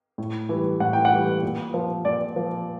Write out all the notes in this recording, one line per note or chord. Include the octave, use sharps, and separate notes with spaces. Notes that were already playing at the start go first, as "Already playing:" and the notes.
A2
E3 G3
A2 F#5
G5
F#5
E3 G3
A#2
F3
A#2 D5
F3